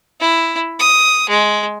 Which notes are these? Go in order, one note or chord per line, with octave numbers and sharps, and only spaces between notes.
E4
D#6
G#3